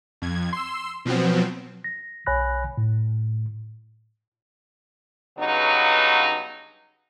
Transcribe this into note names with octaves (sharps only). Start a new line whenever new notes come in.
F2 G#6
C6 E6
B2 F3 F#3 B3 C4
A#6
B1 C#5 G#5 B5 F#6 A#6
A2
G2 C#3 F#3 B3 D#4